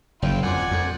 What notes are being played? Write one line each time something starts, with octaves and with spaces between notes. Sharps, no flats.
F#1 E4 F4 G5
F2 D5 F#5 G#5
F2